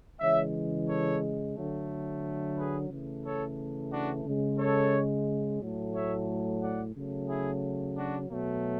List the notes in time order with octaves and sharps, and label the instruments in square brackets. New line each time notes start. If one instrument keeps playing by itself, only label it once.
[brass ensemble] C#3 E3 G#3 C#5 E5
A4 C#5
D3 F#3 A3
G#4 B4
C#3 E3 A3
A4 C#5
D4 F#4
C#3 G#3
A4 C#5
A2 F#3 A3
C#5 E5
D5 F#5
C#3 F#3 A3
E4 G#4
D4 F#4
B2 F#3 A3